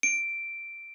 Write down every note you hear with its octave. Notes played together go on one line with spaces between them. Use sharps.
D7